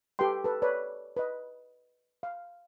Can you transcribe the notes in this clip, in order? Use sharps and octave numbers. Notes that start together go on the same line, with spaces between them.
G4 A4 B4 G5 C6
A4 B4
B4 C#5 D5
B4 D#5
F5